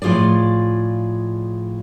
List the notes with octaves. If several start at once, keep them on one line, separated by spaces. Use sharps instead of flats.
A2 F3 F4 G#4 D5